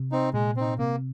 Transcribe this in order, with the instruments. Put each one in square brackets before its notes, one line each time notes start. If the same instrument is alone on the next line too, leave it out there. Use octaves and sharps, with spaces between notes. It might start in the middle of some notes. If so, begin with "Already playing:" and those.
Already playing: [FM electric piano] C3
[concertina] C4 D#4
[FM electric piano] A#2 [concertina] G#3
[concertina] C4 D#4
[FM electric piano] C3 [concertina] A#3